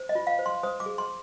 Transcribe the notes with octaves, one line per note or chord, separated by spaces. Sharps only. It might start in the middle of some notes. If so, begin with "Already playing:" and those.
Already playing: C5
D#5
F4
F5
C5
C6
C5 D#6
D6
G#4
C6